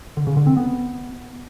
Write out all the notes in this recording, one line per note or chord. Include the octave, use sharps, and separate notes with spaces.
D3
C#3
D3
C4
B3